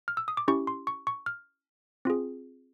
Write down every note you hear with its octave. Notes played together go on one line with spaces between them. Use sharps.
F6
E6
D#6
D6
C#4 E4 G4 C#6
C6
C#6
C#6
F6
C4 F4 G#4